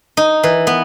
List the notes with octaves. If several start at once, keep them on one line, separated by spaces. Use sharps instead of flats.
D#4
E3
B3